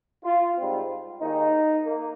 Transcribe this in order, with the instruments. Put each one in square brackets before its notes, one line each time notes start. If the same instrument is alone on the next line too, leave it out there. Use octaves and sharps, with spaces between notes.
[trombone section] F4
G#2 G3 C4
D#2 D#3 G#3 D#4
A#3